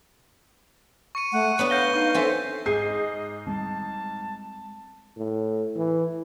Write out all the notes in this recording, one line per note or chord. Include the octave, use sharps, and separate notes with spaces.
C#6 C#7 D#7
A3 F#5
B3 D4 B4 C#5
F5 G6 A#6 G7
D#4 F5 C#6
C4 C#4 A4 E5
G#2 G#4 D#5 G6 C7
G3 G#3 C4 A5
A2
E3